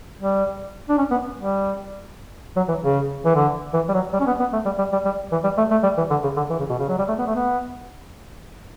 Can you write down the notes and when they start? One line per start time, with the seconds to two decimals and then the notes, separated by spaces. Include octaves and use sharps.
0.20 G3
0.89 D4
0.98 C#4
1.11 B3
1.38 G3
2.56 F#3
2.68 E3
2.83 C#3
3.25 E3
3.35 D3
3.73 E3
3.89 G3
3.94 F#3
4.13 G3
4.20 C#4
4.27 B3
4.40 B3
4.53 A3
4.65 G3
4.78 G3
4.92 G3
5.05 G3
5.32 E3
5.44 G3
5.57 A3
5.71 A3
5.83 G3
5.97 E3
6.10 D3
6.23 C#3
6.37 D3
6.50 E3
6.59 C#3
6.69 B2
6.79 C#3
6.89 F#3
6.98 G3
7.08 A3
7.18 B3
7.27 A3
7.36 B3